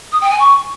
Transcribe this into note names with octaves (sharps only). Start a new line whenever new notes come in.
D#6
G5
G#5
C#6